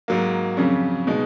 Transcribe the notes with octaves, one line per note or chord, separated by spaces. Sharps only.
G#2 F#3 A#3
F2 C#3 F#3 C#4
B2 G#3 D#4